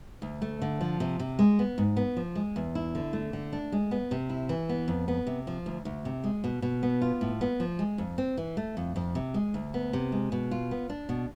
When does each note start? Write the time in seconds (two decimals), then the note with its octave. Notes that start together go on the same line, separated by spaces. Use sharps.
0.22 D2
0.42 A3
0.62 D3
0.81 F3
1.00 C3
1.19 C3
1.39 G#3
1.59 B3
1.78 G#2
1.96 B3
2.17 F3
2.35 G#3
2.56 E2
2.75 E4
2.95 D3
3.13 A3
3.33 D3
3.53 D4
3.72 G#3
3.91 B3
4.11 C3
4.29 E4
4.49 E3
4.69 B3
4.88 F2
5.08 B3
5.26 C3
5.47 F3
5.66 D2
5.85 D2
6.05 C3
6.24 G#3
6.44 B2
6.62 B2
6.83 B3
7.01 F4
7.21 A2
7.41 B3
7.60 F3
7.79 G#3
7.98 F2
8.18 C4
8.37 E3
8.57 A3
8.77 F2
8.96 F2
9.15 C3
9.34 G#3
9.54 D2
9.74 B3
9.93 C3
10.12 G#3
10.32 B2
10.51 F4
10.71 B3
10.89 D4
11.09 B2